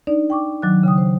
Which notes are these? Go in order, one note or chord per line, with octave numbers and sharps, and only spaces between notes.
D4 D#4 D5
G5 C#6 D6
D#3 F#3 D6 F#6
C#3 G5 D#6
C5